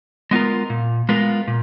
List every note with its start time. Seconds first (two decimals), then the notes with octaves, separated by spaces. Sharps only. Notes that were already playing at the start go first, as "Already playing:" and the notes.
0.31 G#3 B3 F4 A#4
0.70 A#2
1.09 G#3 B3 F4 A#4
1.48 A#2